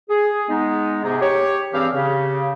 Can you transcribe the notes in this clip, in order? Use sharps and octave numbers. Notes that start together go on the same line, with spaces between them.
G#4
G#3 B3 D#4
G#2 C3 B3 D#4 G#4
G4 C#5
G2 E3 C4 G4 G#4 F5
C#3 G4